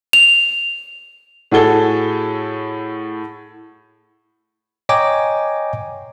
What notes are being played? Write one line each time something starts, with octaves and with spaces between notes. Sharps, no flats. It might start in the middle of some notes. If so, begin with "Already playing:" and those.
F7
A2 F#4 G#4 A4 G7
C#5 D#5 G5 G#5 A#5 D6